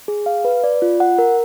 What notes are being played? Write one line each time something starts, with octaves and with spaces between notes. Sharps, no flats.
G#4
F5
B4
D5
F4
F#5
A#4